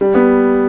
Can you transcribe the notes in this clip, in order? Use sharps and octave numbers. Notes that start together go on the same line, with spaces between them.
G3
B3